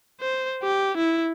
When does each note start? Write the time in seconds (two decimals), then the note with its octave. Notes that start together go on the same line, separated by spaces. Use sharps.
0.20 C5
0.63 G4
0.98 E4